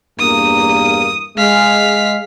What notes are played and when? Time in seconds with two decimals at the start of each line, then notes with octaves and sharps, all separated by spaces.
0.19 E2 G2 A#3 D#6
1.38 G#3 F5 B6